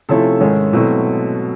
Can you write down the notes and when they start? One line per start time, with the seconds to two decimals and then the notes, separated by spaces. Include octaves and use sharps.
0.09 C3 F3 A3 C#4 E4 A4
0.40 G#2 D#3 G#3 C#4 E4
0.73 B2 F#3 A3 C4 E4